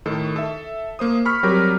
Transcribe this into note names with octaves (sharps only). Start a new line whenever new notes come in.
A2 D#3 A4
A4 E5
A#3 C5 D#6
B5 C#6 F6 B6
F#3 G3 C4 G4 A#4